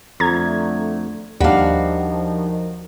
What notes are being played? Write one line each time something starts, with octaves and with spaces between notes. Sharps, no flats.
F2 D3 A3 A#5 G#6
D#2 D#3 F3 G3 D4 F#4 F5